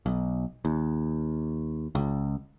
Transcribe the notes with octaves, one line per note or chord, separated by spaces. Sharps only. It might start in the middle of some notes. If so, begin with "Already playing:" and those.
B1
D#2
C#2